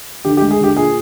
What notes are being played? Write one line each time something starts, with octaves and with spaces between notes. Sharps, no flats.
D3 G4
G4
G#3
G#4
D3 G4
A#2 G#4